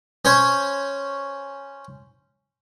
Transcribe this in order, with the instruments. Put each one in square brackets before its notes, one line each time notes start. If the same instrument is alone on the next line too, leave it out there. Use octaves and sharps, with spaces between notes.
[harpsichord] C#4 C5 C#5